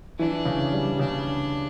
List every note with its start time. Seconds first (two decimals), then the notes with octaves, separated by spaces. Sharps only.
0.19 E3 D4
0.45 C#3
0.72 G3
0.99 C#3 D4